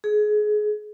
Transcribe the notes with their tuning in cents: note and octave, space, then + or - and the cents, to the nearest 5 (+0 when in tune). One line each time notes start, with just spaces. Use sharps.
G#4 +25